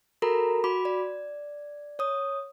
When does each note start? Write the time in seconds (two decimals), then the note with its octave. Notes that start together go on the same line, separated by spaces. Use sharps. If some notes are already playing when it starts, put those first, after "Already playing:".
0.22 F#4 A4 A#4 A#5 B5
0.64 F#4 B5 D6
0.85 D5
1.99 C#5 D#6